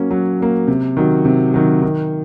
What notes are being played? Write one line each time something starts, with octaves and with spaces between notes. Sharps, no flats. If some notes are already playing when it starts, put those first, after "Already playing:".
Already playing: F#3 A#3 C#4
F#3
A#3 C#4
C3
D#3 F#3
C3
D#3 F#3
D#3